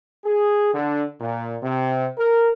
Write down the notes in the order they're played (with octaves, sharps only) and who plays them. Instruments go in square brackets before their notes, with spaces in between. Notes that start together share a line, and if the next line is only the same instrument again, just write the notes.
[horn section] G#4
D3
A#2
C3
A#4